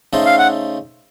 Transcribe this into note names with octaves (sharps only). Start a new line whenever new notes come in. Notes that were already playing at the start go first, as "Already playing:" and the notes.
C#3 A3 D#4 A4 C5
F5
F#5